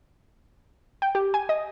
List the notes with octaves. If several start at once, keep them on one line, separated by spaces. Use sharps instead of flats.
G5
G4
G#5
D#5